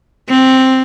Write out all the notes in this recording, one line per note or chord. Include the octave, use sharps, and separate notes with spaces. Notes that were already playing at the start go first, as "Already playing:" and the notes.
C4